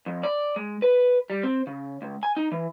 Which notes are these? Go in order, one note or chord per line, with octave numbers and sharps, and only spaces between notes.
F2
D5
G#3
B4
G3
C4
C#3
C#2
G#5
D#4
E3